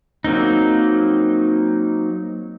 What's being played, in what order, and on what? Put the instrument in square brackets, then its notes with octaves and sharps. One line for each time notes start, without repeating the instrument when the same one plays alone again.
[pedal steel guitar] F#3 A#3 C4 D#4